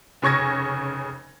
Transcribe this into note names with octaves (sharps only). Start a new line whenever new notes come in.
F1 C#3 C#6 G#6 A#6